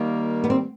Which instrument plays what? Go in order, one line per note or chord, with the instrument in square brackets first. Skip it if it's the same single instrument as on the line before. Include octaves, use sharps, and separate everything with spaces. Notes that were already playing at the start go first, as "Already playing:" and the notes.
Already playing: [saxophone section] D#3 G3 A#3
[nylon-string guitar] B3
C4